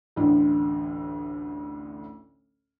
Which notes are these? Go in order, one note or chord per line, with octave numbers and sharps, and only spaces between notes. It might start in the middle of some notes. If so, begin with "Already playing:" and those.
A1 D2 A2 D3